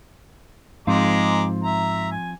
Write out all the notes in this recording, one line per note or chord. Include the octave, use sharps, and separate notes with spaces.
G#2 F3 G#3 C4 F5 A#5 D6
E5 A#5
G#5